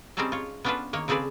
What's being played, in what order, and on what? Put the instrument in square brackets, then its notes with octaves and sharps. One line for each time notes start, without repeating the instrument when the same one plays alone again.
[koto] G3 C4 C#4 D#4 G#4 A4
F4 C#5
B3 C#4 D4 F4 A4 B4
D#3 A#3 C#5
C#3 C4 G#4 A4 B4 D5